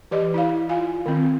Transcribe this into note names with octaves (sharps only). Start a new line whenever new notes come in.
E3 G4 D5 D#5
E4 F5
F4 F5 G#5
D#3 C4